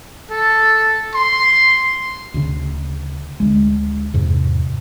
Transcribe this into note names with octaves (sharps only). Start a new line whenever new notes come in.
A4
C6
D2 C#3
D2 G#3
E2 G#2 C3